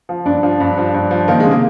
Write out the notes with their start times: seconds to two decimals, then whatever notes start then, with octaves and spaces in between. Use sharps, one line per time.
0.09 F3
0.25 G2 D4
0.43 F3
0.60 G2
0.78 F3
0.94 G2
1.11 F3
1.28 D#3 A#3
1.40 G#3
1.46 C3
1.51 A#3